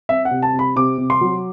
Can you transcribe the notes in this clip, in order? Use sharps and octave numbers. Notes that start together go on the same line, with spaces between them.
C4 E5
F#5
C3
A5
C3
B5
C3 D6
C3
C6
F#3